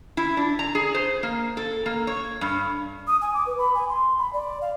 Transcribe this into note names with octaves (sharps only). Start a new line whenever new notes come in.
E4
D4
A#5
G#4
C5
A#3
A4
A#3
C#5
G2
D#6
G#5
D6
B4
B5
G#5
C6
B5
D5
F5